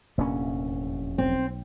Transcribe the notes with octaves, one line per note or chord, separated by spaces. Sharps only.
F1 E2 A#2 A#3 C#4 D4
B1 C4